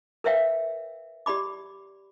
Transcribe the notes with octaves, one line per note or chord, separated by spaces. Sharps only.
A#4 B4 C#5 E5 F5 G5
G4 D5 B5 D6